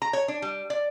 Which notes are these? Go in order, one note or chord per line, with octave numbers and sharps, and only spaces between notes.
A#5
C#5
D4
G3
D5